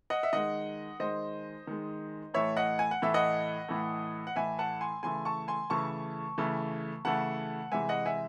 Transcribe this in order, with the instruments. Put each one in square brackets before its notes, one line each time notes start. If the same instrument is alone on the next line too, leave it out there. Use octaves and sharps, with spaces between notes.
[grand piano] D#5 F#5
E5
D#3 G#3 D#5 F#5
D#3 G#3 C5 D#5
D#3 G#3
A2 E3 A3 C#5 E5
D#5 F#5
G#5
F#5
A2 E3 A3 E5
D#5 F#5
A2 E3 A3
F#5
A2 E3 A3 E5 G#5
F#5 A5
G#5 C6
C#3 E3 A3 G#5 C6
A5 C#6
G#5 C6
C#3 E3 A3 A5 C#6
C#3 E3 A3
C#3 E3 A3 F#5 A5
C3 E3 G#3 E5 G#5
D#5 F#5
E5 G#5